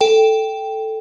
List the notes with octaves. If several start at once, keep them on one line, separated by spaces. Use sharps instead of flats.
A4 G5